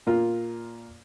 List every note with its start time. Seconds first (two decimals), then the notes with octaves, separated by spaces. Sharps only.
0.07 A#2 A#3 F4